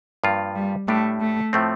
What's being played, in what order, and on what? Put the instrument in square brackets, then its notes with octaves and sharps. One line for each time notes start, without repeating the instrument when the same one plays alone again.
[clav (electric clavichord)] G2 F3 A#3 F4 A#4
[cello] G3
[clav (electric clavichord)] A2 G3 D4 G4 [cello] A3
[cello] A3
[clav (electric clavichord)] A2 F3 A3 C4